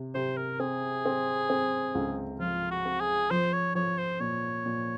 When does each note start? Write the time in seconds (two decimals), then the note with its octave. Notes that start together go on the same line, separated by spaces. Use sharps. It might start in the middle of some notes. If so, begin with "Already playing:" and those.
Already playing: C3
0.15 C3 C5
0.37 A#4
0.60 C4 G#4
1.06 C4
1.50 C4
1.95 C#2
2.40 F3 F4
2.71 F#4
2.85 C4
3.00 G#4
3.30 F3 C5
3.53 C#5
3.75 F3 C#5
3.98 C5
4.20 A#2 C#5
4.66 A#2